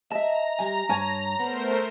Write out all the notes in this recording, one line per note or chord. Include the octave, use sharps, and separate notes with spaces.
D#5 E5 A5 A#5
G3 G#5
G2 C#5 G#5 A5
A3 B3 A#4 C5